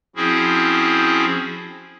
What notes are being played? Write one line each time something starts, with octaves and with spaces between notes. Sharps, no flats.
F3 C4 C#4 E4 F#4 G#4